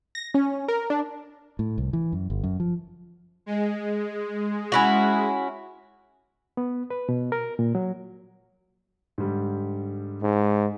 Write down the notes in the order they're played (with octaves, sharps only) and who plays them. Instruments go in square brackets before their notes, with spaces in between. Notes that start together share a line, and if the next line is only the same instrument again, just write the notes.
[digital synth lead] A#6
C#4
A#4
D4
[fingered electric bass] A2
C2
E3
F#2
G1
F#2
F3
[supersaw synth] G#3
[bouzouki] C#4 E4 F#4
[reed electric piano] B3
B4
B2
A#4
A#2
F#3
[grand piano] G#2 D3 G3
[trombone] G#2